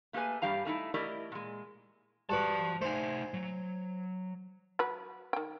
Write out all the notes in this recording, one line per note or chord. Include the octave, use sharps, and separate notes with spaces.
A3 A#3 G4 G#4 B4 G#5
G2 G3 G4 F5 A#5
A3 C#4 D#4 E4
A3 E4 G4 A#4 D5 D#5
A#2 G#3
G2 F#4 B4 C5 A5
A3 D#4 C5 G#5
F#3
F#3 B4
D#3 G5